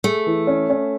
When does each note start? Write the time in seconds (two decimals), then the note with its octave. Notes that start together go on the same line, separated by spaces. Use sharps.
0.04 A3 G#4
0.27 E3
0.47 C#4
0.70 C#4